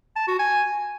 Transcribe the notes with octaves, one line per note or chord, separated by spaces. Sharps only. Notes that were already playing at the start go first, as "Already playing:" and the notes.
A5
F#4
G#5